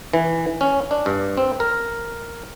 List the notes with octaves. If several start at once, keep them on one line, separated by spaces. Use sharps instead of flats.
E3
C#4
D4
G2
C4
A#4